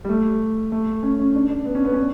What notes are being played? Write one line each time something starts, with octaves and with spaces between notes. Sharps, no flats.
G3
A3
A3
C#4
C#4
D4
D4
B3
C#4
B3
C#4